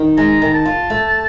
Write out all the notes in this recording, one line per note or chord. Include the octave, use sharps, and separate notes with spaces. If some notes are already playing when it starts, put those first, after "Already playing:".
Already playing: D#3
G#3 A#5
D#3
A5
F4
A3